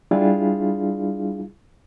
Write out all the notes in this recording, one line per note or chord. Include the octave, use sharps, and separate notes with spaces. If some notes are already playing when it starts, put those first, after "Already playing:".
G3 D4 E4 F4 G#4 F5